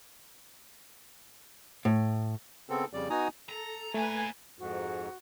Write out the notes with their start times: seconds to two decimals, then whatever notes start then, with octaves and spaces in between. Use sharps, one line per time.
1.85 A2
2.70 C#3 B3 C4 A4
2.93 F2 C#3 G3 D5
3.10 B3 D#4 F#4 G#5 A#5 D#6
3.49 A4 A#5
3.94 A#2 A3 B4 G#5 A#5
4.59 F2 G#2 F#4